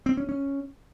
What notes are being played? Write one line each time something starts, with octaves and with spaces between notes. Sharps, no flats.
C4
C#4
C#4